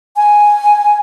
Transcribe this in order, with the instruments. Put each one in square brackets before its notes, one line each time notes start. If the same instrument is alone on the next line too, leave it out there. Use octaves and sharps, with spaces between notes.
[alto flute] G#5